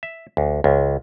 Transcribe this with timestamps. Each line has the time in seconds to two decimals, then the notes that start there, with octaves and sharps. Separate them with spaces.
0.03 E5
0.37 D2
0.64 C#2